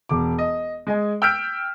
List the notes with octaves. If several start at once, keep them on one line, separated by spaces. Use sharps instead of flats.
E1 D6
D#5
G#3 D#5 G#5
G5 E6 F6 G6 B6 D7